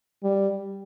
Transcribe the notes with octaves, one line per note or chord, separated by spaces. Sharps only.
G3